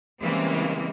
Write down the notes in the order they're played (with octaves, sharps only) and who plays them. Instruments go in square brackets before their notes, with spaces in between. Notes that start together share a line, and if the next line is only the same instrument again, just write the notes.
[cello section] C#3 E3 G3 G#3 A#3 C4